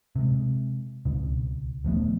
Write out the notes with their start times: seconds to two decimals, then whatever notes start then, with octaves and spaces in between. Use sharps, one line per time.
0.16 C3 G#3
1.05 C#2 B2
1.84 D#1 F3 A3 B3